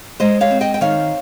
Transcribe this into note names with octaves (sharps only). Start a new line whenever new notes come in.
G#3 C5 D#5
C#5 F5
C4
D#5 G5
G5
D#3 C#5 F5